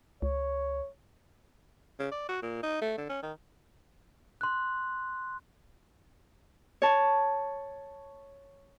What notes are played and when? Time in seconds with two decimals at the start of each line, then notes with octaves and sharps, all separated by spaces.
0.22 C#2 C#5
1.99 C#3
2.12 D5
2.29 F#4
2.43 A#2
2.63 D#4
2.82 A3
2.98 D3
3.09 C#4
3.23 D#3
4.41 C6 F#6
6.82 C#5 A5